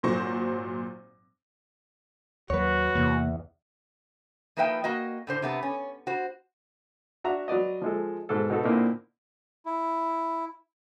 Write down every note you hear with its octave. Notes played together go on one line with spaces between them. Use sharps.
G#1 A#2 F#3 C5 C#6 A#6
D#2 F#3 F#4 B4 C#5
E2 C3 A#3
F3 A#3 D#4 B4 E5 G5
A#3 F#4 D#5
A2 D3 C5
C3 A3 B3
C#4
F#4 C5
D4 F#4 E5 A#5
F#3 B4 D5 D#5
F3 G#3 A4
G#2 B2 A4
B2 D#4 F#4 A4
A#2 D3 A#3 C4 D#4 E4
E4